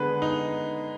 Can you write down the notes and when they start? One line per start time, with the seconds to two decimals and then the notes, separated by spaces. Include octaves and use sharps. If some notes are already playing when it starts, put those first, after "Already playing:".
Already playing: D3 G#3 B3 G#4 B4
0.22 D#4